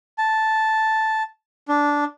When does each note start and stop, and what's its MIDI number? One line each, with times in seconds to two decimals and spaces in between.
0.18 1.23 81
1.68 2.04 62